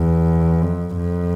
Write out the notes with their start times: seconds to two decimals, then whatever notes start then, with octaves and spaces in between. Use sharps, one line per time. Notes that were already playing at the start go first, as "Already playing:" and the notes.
Already playing: E2
0.61 F2
0.97 F2